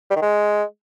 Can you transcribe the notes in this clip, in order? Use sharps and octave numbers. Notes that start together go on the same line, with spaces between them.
G3
D#3
G#3